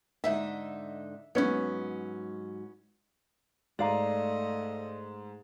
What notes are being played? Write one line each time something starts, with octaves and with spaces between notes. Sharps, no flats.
G#2 D3 D#4 E5
G#2 F#3 B3 C#4
G#2 A3 D5 D#5 F5 A#5